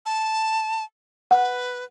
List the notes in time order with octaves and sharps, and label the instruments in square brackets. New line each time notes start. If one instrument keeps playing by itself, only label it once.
[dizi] A5
[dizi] B4 [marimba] F#5